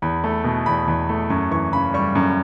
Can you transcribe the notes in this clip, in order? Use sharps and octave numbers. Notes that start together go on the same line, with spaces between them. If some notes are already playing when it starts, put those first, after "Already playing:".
E2 B5
A3
B2
E2 B5
E2
A3
F#2 C#6
E3 C#6
C#3 B5
G3 C#6
F#2